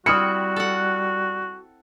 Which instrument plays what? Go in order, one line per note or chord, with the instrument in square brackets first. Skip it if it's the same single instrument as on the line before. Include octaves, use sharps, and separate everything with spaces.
[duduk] G3 [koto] C4 E4 [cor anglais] F#4 [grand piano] D#6 F6 C#7
[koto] A4 F#5